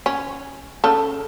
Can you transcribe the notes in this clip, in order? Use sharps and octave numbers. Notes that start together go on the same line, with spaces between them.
C#4
C#3 A4